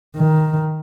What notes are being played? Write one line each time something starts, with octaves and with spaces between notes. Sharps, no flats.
D#3